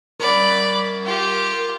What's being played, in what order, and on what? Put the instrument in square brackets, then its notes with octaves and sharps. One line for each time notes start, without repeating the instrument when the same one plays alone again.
[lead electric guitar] A#4 F#5 [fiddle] D5 B5
[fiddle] F4 G4